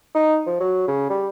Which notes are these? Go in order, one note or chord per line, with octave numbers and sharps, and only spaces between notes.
D#4
F3
F#3
C#3
G3